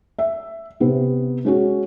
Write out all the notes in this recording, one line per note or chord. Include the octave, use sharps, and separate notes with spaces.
E5
C3 B3
G#3 C#4 F#4